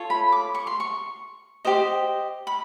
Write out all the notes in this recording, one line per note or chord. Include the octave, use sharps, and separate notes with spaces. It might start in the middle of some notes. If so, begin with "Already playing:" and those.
Already playing: F4 A4 C#5
B5
D6
C#6
C6
C#6
G4 C5 D#5
B5